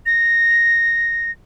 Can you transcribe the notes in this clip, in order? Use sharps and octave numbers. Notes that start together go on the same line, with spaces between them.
A#6